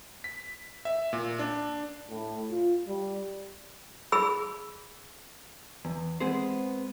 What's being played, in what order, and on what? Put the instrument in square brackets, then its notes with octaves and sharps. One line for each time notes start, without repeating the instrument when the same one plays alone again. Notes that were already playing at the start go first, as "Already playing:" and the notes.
[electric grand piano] B6
E5
A#2
D4
[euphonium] A2
F4
G3
[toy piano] G#4 B5 E6
[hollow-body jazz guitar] E2
G#3 B3 C4 G#4 C5